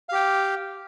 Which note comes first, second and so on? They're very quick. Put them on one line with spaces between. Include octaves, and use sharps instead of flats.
F5 G4 G5